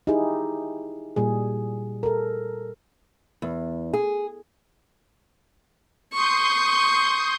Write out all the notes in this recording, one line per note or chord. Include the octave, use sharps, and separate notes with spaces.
D#4 E4 G4 G#4
A#2 G3 G#4
A4 A#4
E2
G#4
C6 C#6 D#6 G6